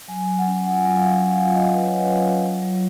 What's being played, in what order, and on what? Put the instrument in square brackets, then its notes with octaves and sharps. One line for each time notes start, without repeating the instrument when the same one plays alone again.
[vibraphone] F#3 G#5
F#3
F#5
C#4
F4 F#5
G#5
F#3 F#5
F5
F#3
C#4 F5
F4
D#5
F#3
B4
F#3 C#5
C#4
F4
F#3
F#3